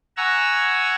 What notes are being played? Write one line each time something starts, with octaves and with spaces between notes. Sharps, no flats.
F#5 G#5 A#5 C#6 E6